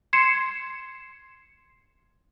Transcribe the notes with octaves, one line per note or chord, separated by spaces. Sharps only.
C6 G#6 C7 C#7 E7